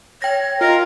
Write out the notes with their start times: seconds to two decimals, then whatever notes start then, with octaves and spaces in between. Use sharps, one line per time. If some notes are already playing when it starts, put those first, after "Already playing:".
0.22 C#5 G5 A#6
0.61 F4 A#4 D#5